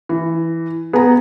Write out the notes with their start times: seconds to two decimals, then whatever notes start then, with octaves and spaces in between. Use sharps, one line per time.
0.09 E3
0.93 B3 G#4 A#5